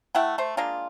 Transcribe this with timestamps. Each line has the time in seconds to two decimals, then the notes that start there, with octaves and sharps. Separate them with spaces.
0.15 A3 E4 F#5 G5
0.38 A3 C5
0.57 G#3 A#3 D4 F4